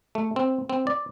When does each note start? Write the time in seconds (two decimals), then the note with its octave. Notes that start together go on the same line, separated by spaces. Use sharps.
0.15 A3
0.36 C4
0.70 C4
0.87 D5